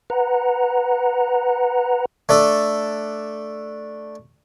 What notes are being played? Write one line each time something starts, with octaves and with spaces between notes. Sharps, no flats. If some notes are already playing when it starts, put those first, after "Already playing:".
B4 F#5 A#5
A3 D4 A4